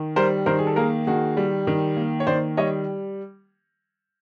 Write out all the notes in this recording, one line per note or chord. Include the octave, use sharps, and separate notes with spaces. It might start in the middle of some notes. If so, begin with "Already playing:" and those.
Already playing: D#3
G3 A#4 C5
D#3 A#4 C5
G#4
A4
A#3 G#4 A#4
D#3 F#4 G#4
G3
D#3
A#3
C#5
D#3 C5 D5
G3 C#5 D#5